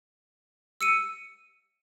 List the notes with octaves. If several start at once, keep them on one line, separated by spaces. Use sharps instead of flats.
E6 C#7 D#7